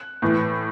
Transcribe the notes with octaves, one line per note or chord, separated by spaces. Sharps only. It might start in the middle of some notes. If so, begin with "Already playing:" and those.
Already playing: F#6
A2 E3